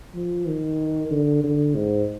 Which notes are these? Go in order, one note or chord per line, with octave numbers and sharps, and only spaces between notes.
F3
D#3
D3
D3
G#2